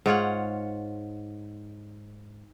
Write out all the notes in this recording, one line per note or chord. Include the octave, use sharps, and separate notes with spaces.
G#2 F4 C#5 F#5